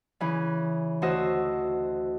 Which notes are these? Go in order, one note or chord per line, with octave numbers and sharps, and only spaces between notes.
C#3 E3
D2 F#4 C5 D#5 E6